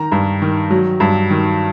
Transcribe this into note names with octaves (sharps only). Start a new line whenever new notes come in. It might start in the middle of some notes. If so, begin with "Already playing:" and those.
Already playing: D#3 A#5
G2
D#3
F#3
G2
D#3